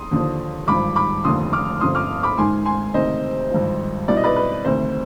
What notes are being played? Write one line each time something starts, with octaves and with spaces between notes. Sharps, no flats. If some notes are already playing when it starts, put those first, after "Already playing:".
Already playing: C6 D#6
D#2 D3 F3
G#1 G2 F3 B5 D6
B5 D6
F1 D#2 D3 F3 C6 D#6
D6 F6
G1 F2 D3 C6 D#6
D6 F6
B5 D6
G#1 G#2 D#3 G#5 C6
G#5 C6
D2 C3 D#3 C5 D#5
G#1 G2 F3
C2 B2 D5
D#5
B4 D5
B4
D2 C3 D#3 C5